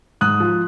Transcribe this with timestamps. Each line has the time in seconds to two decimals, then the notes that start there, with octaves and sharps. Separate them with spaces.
0.21 G#2 D#6 F#6
0.40 F3